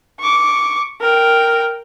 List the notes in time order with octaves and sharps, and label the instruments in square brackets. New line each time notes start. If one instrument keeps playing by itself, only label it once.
[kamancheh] C#6 D6
A#4 G5